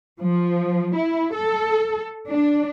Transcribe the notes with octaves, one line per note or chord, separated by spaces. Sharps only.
F3
E4
A4
D4